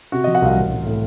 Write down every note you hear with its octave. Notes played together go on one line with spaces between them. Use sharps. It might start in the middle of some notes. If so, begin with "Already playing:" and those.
C3 F#4
F3 D#5
F#5
C2 F5
A1
A1
A2